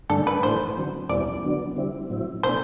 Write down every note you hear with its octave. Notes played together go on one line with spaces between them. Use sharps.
G2 D3 A3 D4 A4
B4
A2 E3 A3 D4 C5
D3 F#3 C4
E2 B2 G3 C4 E4 D5
D3 F#3 B3 D4
D3 G3 C4 E4
A2 F#3 C4 E4
B2 A3 D4 C5